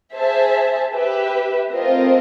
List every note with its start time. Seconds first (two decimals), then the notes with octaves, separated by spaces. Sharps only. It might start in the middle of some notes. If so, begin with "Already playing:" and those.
0.15 G#4 C5 E5 A5
0.94 G4 B4 E5
1.72 A3 C4 F4 A#4 D#5